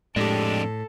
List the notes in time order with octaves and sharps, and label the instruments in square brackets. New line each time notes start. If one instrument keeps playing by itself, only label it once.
[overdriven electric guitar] F2 D4 [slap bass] A2 [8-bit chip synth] G#3 G4 [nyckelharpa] A4